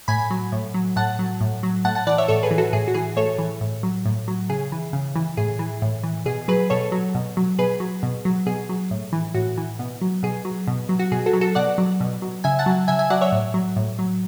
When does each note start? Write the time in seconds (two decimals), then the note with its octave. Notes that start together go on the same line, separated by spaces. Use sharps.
0.08 A2 G#5 B5
0.31 F#3
0.52 A2
0.74 F#3
0.96 A2 F#5 A5
1.19 F#3
1.41 A2
1.63 F#3
1.85 A2 F#5 A5
1.95 F#5 A5
2.07 E3 D5 F#5
2.18 C#5 E5
2.28 A2 A4 C#5
2.43 G#4 B4
2.51 E3
2.58 F#4 A4
2.73 A2 G#4
2.88 F#4
2.94 E3 G#4
3.16 A2 A4 C#5
3.39 E3
3.61 A2
3.83 F#3
4.05 A2
4.28 F#3
4.49 C#3 G#4
4.72 E3
4.93 C#3
5.16 E3
5.37 A2 G#4
5.59 E3
5.82 A2
6.03 E3
6.26 B2 G#4
6.48 F#3 G#4 B4
6.70 B2 A4 C#5
6.92 F#3
7.15 B2
7.37 F#3
7.58 B2 G#4 B4
7.80 F#3
8.03 B2
8.25 F#3
8.46 B2 G#4
8.69 F#3
8.91 A2
9.13 E3
9.34 A2 F#4
9.57 E3
9.79 B2
10.02 F#3
10.23 B2 G#4
10.45 F#3
10.67 B2
10.89 F#3
10.99 F#4
11.12 B2 G#4
11.26 F#4 A4
11.33 F#3
11.41 F#4 A4
11.55 B2 D5 F#5
11.78 F#3
12.00 B2
12.22 F#3
12.44 C#3 E5 G#5
12.59 F#5 A5
12.66 F#3
12.88 C#3 E5 G#5
12.99 E5 G#5
13.10 F#3 D5 F#5
13.21 C#5 E5
13.32 A2
13.54 F#3
13.76 A2
13.99 F#3